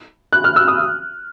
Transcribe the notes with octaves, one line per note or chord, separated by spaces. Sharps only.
F#6
F6
E6
D#6